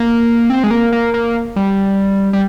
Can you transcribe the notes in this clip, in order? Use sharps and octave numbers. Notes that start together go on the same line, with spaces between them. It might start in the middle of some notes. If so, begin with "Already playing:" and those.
Already playing: A#3
C4
G#3
A#3
A#3
A#3
G3
G3